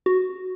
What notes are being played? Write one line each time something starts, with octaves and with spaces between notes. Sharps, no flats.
F#4